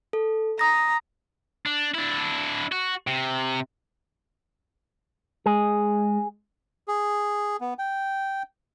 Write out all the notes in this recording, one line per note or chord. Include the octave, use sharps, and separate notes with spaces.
A4
A#5 D#6 A#6
D4
D4 E4
F#4
C3
G#3 G#4
G#4
B3
G5